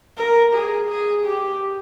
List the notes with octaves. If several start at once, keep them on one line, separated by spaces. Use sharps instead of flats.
A#4
G#4
G#4
G4